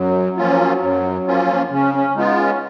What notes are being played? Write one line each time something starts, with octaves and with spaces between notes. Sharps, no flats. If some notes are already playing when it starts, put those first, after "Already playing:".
Already playing: F#2 F#3
F3 A#3 C#4 F4
F#2
F3 A#3 C#4 F4
C#3 C#4
C#4
G#3 B3 D#4 F4
C#4